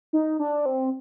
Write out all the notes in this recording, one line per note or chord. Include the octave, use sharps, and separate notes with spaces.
D#4
D4
C4